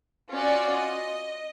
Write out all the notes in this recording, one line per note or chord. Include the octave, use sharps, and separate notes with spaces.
C#4 F4 F#4 D5
D#5